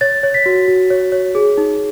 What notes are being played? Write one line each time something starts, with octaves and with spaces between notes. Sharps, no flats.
C#5 A6
C#5
B6
F#4
F#4
C#5
C#5
G#4
D#4